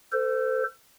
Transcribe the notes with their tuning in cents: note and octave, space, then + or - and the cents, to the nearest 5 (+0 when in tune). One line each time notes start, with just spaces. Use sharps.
A4 +25 C5 -25